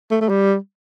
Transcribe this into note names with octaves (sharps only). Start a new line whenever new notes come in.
A3
A3
G3